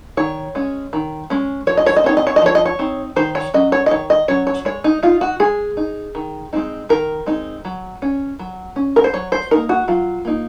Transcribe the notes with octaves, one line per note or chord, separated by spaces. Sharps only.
D#3 C#5
G#3 C#4
D#3
G#3 C#4
F3 C#5
D#5
C#5
D#5
C4 D#4 C#5
D#5
C#5
D#5
F3 C#5
D#5
C#5
C4 D#4
D#3 C5
C#5
F#3 C#4 D#5
C#5
D#5
D#3 C#5
D#5
F#3 C#4 C#5
C#5
G#3 C#5
D#4
D#4 F4
F#4
G#3 G#4
D#4
D#3
G#3 C4 D#4
D#3 A#4
G#3 C4 D#4
F#3
C#4
F#3
C#4
A#4
C5
F#3 C#5
C5
A#3 D#4 A#4
F#4
F#3 F4
A#3 D#4